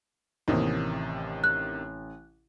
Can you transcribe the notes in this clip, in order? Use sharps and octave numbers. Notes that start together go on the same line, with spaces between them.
A1 C3 D#3 A#3 C4 D#4
F#6